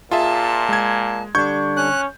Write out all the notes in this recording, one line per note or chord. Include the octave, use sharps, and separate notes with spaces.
A#2 F4 G#4 E5 A5
G#3 G#6
D3 G3 D4 C#6 G6 G#6
C#4 F#6